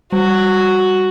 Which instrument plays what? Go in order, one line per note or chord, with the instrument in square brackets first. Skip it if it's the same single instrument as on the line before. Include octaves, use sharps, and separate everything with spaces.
[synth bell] G3 [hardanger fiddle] F#4